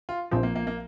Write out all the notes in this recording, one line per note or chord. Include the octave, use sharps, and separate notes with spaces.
F4
A#1 A#2 F3 C4
A#3
A#3
A#3